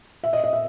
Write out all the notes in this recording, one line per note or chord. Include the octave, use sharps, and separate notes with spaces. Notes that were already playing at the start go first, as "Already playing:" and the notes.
E5
D#5
D#5
E5